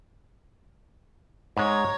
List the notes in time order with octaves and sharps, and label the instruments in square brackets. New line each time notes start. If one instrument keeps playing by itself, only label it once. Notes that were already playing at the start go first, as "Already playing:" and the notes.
[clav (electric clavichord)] G#2 G#3 [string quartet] C#5 A#5